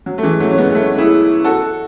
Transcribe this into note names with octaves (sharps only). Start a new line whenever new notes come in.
F#3
A3
E3 G#3
F#3 A3
C#4
G#3 B3
B3
A3 C#4
E4 G#4
F#4 A4